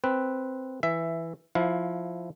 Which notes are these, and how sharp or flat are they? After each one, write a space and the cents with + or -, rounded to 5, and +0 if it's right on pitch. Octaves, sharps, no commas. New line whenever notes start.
C4 +0 B4 +0
E3 +0 E5 +10
F3 +0 E4 +0 F5 +25